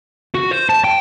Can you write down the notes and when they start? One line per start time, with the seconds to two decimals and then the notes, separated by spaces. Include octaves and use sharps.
0.35 F#4
0.52 C5
0.70 A5
0.85 G5